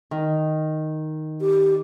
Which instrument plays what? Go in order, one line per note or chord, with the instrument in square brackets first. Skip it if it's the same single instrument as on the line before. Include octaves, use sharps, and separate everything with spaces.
[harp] D#3
[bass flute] G4